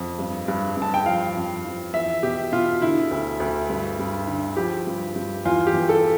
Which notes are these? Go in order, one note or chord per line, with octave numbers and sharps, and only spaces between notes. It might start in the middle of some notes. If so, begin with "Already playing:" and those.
Already playing: F2
G2
G2
G2 A5
G5
F3 F5
F2
F3
E2 E5
B2 G4
B2 F4
D3 E4
D2
D2
G2
G2
D3
F3 G4
G2
G2
E2 F4
G4
E2
A4